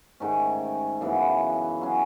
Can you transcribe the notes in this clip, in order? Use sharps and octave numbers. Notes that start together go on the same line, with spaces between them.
G#2 D#3 A3 C#4
F#2 C#3 E3 B3
F#3 C#4 G#4